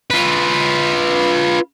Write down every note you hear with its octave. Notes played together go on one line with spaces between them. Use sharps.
F4 B4